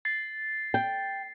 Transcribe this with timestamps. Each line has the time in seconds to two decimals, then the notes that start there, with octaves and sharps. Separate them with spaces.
0.05 A6 C7
0.74 G5